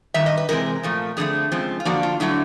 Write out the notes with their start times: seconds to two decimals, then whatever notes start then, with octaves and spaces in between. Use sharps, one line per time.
0.14 G2 D#3 E5
0.26 D#5
0.37 B4
0.49 C3 E3 G#3 C4 A#4
0.83 A#2 F3 A3
1.17 F2 D3 F3 A3 G#4
1.52 C#3 F3 G#3 C4
1.80 F4
1.85 D3 F3 A#3 D4 F#4
2.03 F4
2.20 D3 F#3 A3 E4